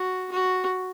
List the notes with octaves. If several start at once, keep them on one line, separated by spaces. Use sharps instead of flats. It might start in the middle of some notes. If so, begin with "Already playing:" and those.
Already playing: F#4
F#4